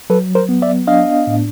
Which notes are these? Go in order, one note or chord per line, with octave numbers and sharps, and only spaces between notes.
F#3 A4 B4
A#4 C5
B3
D5 E5
D4 D#5 F5
A2